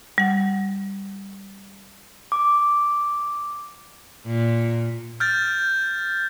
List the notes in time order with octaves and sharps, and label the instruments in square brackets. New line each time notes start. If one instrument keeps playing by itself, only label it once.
[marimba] G3 F#5
[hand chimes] D6
[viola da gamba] A#2
[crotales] F6 G6 A6